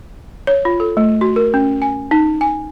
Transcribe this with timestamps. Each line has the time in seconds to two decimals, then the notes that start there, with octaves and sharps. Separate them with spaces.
0.47 C#5
0.65 F4
0.80 A4
0.97 A3
1.21 F#4
1.36 A#4
1.54 C#4
1.82 G#5
2.11 D#4
2.41 G#5